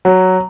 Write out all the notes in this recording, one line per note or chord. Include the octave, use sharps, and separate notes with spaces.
F#3